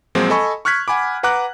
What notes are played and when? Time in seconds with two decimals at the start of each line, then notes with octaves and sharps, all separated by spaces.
0.15 A#2 F3 F#3 G#3 C4
0.30 A4 D#5 G#5 B5 C#6
0.65 C#6 F6 F#6 G#6 B6
0.88 F#5 G#5 B5 D6
1.23 B4 F#5 A#5 D6 F#6